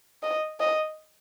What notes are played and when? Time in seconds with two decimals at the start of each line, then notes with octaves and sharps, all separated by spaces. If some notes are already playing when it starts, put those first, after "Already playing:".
0.23 D#5
0.60 D#5